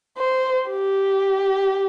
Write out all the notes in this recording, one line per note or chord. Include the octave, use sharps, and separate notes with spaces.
C5
G4